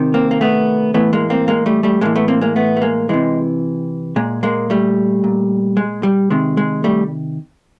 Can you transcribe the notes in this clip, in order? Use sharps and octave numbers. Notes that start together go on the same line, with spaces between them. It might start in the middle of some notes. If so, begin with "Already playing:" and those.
Already playing: C3 D#3
A#3 C4
A#3
A3 B3
A2 E3 A3 B3
G#3 A#3
A#3 C4
G#3 A#3
G3 A3
G3 A3
A2 E3 G#3 A#3
A3 B3
A#3 C4
G#3 A#3
A3 B3
A3
G#3 A#3
C3 E3 G#3
A#2 G#3
G#3 A#3
G3 A3
A#2
G#3
G3
C3 D#3 G#3
G#3
G3 A3